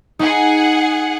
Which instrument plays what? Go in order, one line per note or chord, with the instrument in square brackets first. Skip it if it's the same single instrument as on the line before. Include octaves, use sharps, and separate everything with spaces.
[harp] D#4 [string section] G#4 F#5